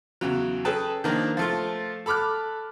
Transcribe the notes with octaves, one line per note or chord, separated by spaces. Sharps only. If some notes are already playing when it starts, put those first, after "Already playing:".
E2 C#3 F#3
C#4 G#4 A4 B4 G5 A5
D#3 F3 A#3 D4
F3 A3 F4
A4 B5 D6 F6 F#6